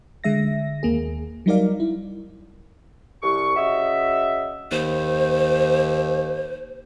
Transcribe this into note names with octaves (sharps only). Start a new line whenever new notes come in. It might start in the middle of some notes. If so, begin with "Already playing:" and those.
D3 G#3 E5 A#6
D#2 A#3 G#4
F#3 G3 D#4 A#4 D5 F5
E4
C2 C#6
C#3 F#4 D#5 E5
D#2 C5